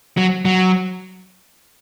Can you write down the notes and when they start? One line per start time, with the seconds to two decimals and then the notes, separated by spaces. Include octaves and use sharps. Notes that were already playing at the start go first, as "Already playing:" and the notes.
0.17 F#3
0.45 F#3